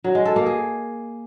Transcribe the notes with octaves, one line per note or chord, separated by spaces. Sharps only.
F#3
G#3
A4
A#3
G#4